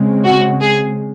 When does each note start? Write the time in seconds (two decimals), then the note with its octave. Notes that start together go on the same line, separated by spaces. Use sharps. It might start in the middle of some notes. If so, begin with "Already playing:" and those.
Already playing: C#3 G#3 C4
0.25 F#4
0.61 G#4